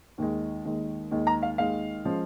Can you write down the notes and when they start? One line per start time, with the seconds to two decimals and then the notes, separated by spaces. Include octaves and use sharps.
0.18 D#2 D#3 G#3
0.65 D#2 D#3 G#3
1.11 D#2 D#3 G#3
1.27 A#5
1.43 F5
1.58 D#2 D#3 G#3 F5
2.05 F3 G#3 C#4